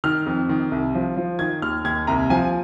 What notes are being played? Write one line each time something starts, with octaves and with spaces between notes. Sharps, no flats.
D#3 F6
F2
D#3
C2
F3
F3
D#3 G#6
D#2 F6
D#2 G#6
C2 A#5
F3 G#5